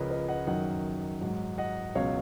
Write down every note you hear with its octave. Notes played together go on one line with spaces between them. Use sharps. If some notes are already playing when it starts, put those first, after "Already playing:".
Already playing: C#2 C#3 F3 A#4 B4 C#5 D#5
B4 D#5
D#5 F#5
F#2 D#3 F#3 D#5 F#5
G#2 F#3
D#5 F#5
C#2 B2 F#3 C#5 F5